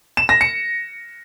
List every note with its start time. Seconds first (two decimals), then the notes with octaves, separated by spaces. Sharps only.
0.17 E7
0.29 A#6
0.41 C#7